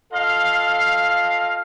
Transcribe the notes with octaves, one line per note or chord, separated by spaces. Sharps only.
F4 A4 D#5 F5